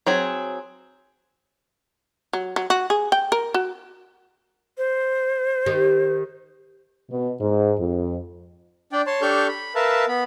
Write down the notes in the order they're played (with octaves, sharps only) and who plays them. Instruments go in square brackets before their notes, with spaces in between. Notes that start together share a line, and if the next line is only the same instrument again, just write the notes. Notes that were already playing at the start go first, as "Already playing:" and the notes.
[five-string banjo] F#3 C4 G#4
[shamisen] F#3
F#3
F#4
G#4
G5
A#4
F#4
[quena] C5
[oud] D#3 G4
[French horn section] B2
G#2
F2
[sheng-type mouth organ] D4 D5 G5
C#5 A5 C6
D4 G4 A4 C#6 F6 G6
B5
A#4 B4 E5 F5 A5
B3 B5